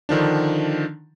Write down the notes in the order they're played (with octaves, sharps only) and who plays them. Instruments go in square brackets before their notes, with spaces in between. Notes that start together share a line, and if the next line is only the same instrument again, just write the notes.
[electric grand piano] D3 D#3 F3 D4